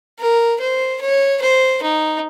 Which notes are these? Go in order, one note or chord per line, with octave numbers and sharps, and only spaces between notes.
A#4
C5
C#5
C5
D#4